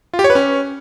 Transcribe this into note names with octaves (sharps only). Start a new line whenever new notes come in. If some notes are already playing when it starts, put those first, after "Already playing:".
F4
G4
C#5
B4
C#4